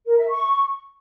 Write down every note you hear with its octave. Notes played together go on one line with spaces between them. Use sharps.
A#4
E5
C#6